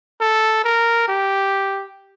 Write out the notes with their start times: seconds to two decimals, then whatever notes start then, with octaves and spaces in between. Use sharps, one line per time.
0.20 A4
0.64 A#4
1.08 G4